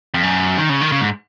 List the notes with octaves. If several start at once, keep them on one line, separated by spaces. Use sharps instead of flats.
F2
F#2
D#3
C#3
D#3
C#3
G#2